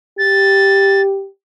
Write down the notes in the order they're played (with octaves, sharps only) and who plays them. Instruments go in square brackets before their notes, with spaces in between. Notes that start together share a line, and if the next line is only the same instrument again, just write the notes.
[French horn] G4 [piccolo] A6